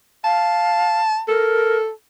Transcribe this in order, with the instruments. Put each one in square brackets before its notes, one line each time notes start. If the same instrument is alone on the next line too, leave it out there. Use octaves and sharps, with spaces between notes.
[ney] F5 [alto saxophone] A5
[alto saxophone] A4 [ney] A#4